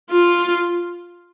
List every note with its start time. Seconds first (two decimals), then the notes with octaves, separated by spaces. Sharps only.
0.11 F4